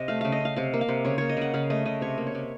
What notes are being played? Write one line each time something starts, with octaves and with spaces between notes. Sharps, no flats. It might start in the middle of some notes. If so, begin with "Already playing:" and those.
Already playing: C3 D#5
A3 F5
C#3 F5
D#5
C#3 F5
C3 F5
A#3
F5
C3
C#3 C#5
A#3 C#5
D#5
C#3 F#5
C#3 F5
A3 D#5
C#3 D#5
C3 C#5
A#3
C#5
C3